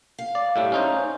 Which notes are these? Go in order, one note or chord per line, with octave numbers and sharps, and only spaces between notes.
F5
D5
A2 G3 A3
C#4 D#4 C5